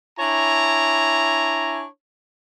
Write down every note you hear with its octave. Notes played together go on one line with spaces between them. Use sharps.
D4 E4 C#5 G#5 A#5